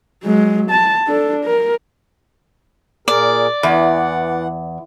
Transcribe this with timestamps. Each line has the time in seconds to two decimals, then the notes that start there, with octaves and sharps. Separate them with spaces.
0.24 F#3 G#3
0.71 A5
1.07 D4 A4
1.45 A#4
3.08 A#2 G#4 A#4 D5
3.63 E2 E3 F#5